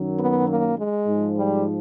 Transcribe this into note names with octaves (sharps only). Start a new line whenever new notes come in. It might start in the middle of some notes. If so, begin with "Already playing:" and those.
Already playing: F#2 D#3 F#3
B3
A#3
G#3
G#2 F3
G3